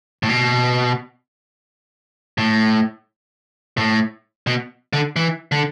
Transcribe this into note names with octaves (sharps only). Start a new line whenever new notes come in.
A2
B2
A2
A2
B2
D3
E3
D3